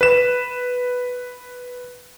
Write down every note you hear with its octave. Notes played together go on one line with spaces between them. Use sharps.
B4 E7